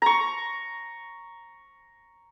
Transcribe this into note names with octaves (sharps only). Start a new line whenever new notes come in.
A#5 C#6